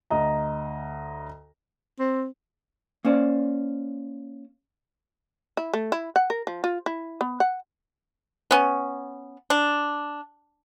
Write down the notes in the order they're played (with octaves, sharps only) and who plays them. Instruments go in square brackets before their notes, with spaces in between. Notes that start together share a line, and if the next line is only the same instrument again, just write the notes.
[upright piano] D2 D#5 A#5
[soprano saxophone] C4
[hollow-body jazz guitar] A#3 C#4 C5 D5
[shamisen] E4
A3
E4
F#5
A#4
F3
F4
E4
B3
F#5
[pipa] B3 C#4
D4